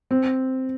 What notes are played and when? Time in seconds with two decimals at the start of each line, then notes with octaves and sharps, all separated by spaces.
0.11 C4